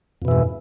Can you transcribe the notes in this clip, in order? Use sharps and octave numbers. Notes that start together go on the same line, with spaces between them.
F2 G#2 B2 E3